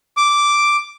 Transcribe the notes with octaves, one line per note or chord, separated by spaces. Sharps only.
D6